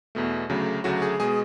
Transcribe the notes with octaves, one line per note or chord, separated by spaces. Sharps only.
E2 B2 A3
D2 C#3 F#3 A3
D2 C#3 F#3 A3 F#4
G#4
B2 G#3 G#4